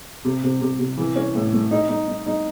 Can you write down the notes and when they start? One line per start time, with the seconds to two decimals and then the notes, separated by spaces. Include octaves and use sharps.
0.25 C3
0.43 C3
0.61 C3
0.79 C3
0.98 E3
1.16 C#4
1.35 A2
1.53 A3
1.71 D#4
1.89 D#4
2.08 D#4
2.26 D#4